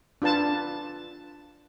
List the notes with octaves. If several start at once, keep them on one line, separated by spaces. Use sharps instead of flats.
D4 F4 B4 A5